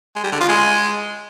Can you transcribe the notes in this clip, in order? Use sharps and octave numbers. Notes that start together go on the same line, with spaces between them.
G#3
G3
D3
F4
G#3